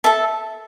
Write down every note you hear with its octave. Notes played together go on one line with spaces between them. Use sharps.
A4 E5 A5